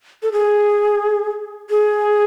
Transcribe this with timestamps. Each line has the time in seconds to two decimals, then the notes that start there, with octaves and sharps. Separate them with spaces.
0.23 A4
0.32 G#4
1.70 G#4